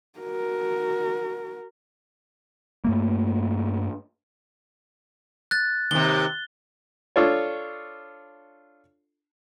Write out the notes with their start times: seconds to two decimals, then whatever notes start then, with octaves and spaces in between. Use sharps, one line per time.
0.19 F#4 A#4
2.84 G2 A3 A#3
5.51 F#6 A6
5.91 D#2 C3 G7
7.16 D4 F4 A4 C#5